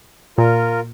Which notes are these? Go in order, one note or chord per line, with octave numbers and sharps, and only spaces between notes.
A#2 F4 A#4